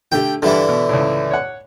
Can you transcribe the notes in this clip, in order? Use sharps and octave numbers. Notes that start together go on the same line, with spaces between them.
D3 A3 G4 G5
G2 D3 E3 G3 E4
B2
C#2 A2
C#5 F#5